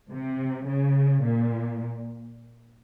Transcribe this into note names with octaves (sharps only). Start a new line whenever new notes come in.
C3
C#3
A#2